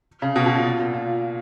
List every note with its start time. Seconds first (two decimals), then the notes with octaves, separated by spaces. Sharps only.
0.22 C#3
0.36 B2
0.46 B2
0.55 A#2
0.79 A#2
0.94 A#2